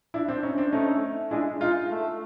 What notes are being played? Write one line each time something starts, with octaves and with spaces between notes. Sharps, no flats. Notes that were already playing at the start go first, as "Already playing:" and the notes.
D4 E4
C4 D4
C#4 D#4
C4 D4
A3 C#4 D#4
G#3 D4 E4
G#3 D#4 F4
A3